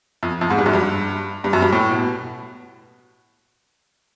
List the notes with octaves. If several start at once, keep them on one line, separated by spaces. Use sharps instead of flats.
F2
F2
G#2
G2
F#2
G2
G2
F#2
G2
A2
B2